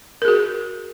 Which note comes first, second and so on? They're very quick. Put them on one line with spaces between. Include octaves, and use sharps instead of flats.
A#4 G#4 F#4